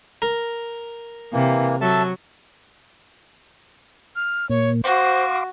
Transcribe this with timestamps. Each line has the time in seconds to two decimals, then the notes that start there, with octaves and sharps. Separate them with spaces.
0.22 A#4
1.33 C3 E3 A#3
1.81 F#3 A4 E5 A5
4.16 F6
4.50 A#2 A#3 C#5
4.84 F#4 C5 F5 C6 D6